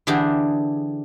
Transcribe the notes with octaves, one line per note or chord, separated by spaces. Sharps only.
D3 E3 D4 G4 G#4